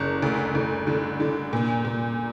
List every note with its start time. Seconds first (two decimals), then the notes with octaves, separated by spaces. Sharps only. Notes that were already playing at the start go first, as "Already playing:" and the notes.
Already playing: F#1
0.22 D2
0.55 D2
0.87 D3
1.20 D3
1.53 A#2
1.85 A#2